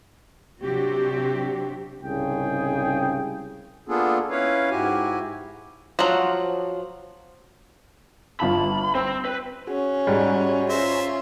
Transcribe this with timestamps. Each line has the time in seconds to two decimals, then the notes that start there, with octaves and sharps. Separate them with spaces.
0.63 C3 F#3 C4 D4 F#4 G4
2.03 C2 G#2 C#3 G#4 G5
3.88 A#3 B3 D4 F4 G#4 A4
4.30 C#4 E4 B4 C#5 F5
4.70 G#2 E4 F#4 G4 G#5
5.99 F3 F#3 F4 F#4
8.40 G1 F4 A5 B5
8.95 C4 C5
9.25 B4
9.67 C#4 F#4 G#4
10.07 G#2 G3
10.70 C#4 F4 C5 E5 A#5 B5